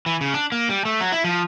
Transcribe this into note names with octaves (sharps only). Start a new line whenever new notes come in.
E3
C#3
D4
A#3
G3
A3
F#3
E4
F3